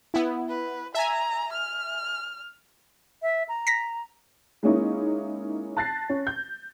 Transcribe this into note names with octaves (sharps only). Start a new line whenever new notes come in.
B3 E4
B4
E5 G#5 A#5
F6
E5
A#5
A#6 B6
G#3 A#3 C#4 D#4 E4
A5 F#6 A6 A#6 C7
C#4
G6